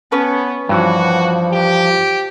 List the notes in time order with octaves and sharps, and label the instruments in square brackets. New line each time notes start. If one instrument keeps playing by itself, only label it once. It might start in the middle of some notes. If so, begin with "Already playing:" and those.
[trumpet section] B3 [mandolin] C#4 B4 A5
[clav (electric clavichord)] G2 E3 [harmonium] F3 [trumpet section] F#4
[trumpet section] G4